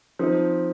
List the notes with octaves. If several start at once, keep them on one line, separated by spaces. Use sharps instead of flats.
F3 C4 D#4